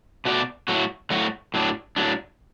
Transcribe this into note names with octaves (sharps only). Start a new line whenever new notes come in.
B2 A3 F#4 D5
A2 F#3 A3 F#4
A2 F#3 A3 F#4
A2 F#3 D4
A2 F#3 D4